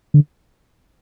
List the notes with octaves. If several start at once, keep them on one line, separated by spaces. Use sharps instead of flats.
D3